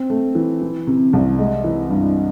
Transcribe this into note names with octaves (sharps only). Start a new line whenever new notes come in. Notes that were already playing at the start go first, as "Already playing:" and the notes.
Already playing: C4
A3
E3
E3
C3
C2
G#3
E3
G2